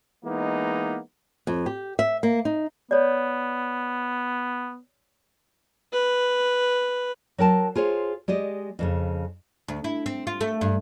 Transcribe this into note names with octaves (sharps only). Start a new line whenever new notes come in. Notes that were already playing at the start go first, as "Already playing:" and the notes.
E3 G#3 A#3 B3 D#4
F2
G4
E5
A#3
D#4
B3 C#5 D5
B4
F#3 A#4 G5 A5
F4 G#4 C5 C#5
G#3 G4 D5 D#5
F2 A2 C#3
D2
E4
C4
F4
A3
G2